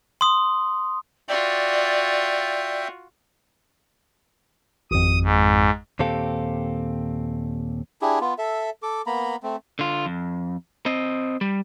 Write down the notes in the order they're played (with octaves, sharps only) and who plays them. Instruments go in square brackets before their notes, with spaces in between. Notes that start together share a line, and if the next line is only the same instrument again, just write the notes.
[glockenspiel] C6 D#6
[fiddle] F4 F#4 [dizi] D5 [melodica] E5 G5
[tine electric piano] G#1 F2 [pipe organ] D#6
[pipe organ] G#2
[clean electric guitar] D#2 A#2 C4 G4 A4 F5
[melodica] D4 E4 G4 G#4
B3 F4
A4 E5
A4 D6
A#3 B3 A#5 B5
A3 C4
[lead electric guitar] D3 F4
F2
C4 D#5
G3